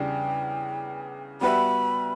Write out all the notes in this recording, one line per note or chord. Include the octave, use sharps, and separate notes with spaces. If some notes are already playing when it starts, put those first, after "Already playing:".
Already playing: E2 C#3 G3 D4 G5
G3 B3 F#4 B4 E5 B5